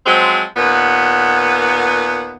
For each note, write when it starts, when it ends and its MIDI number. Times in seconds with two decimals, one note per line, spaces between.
0.06 0.44 53
0.06 0.44 54
0.06 0.44 56
0.06 0.44 60
0.57 2.36 39
0.57 2.36 46
0.57 2.36 59